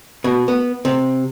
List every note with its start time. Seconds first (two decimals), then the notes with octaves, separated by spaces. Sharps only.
0.24 B2
0.48 B3
0.85 C3